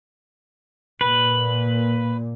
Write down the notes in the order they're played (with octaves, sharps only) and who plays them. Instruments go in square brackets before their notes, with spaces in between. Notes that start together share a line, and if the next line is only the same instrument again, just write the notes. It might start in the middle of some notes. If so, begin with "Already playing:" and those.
[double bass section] A#2 [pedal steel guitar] B4